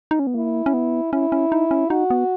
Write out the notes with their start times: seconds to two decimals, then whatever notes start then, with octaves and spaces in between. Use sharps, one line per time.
0.11 D#4
0.19 C#4
0.27 B3
0.35 A#3 E4
0.66 C#4
0.74 B3
1.13 C#4 E4
1.32 C#4
1.52 D#4
1.71 C#4
1.90 D#4 F#4
2.10 B3